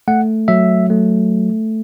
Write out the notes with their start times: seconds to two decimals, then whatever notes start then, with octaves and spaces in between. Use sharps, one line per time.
0.08 A3 F#5
0.48 F#3 E5
0.90 A3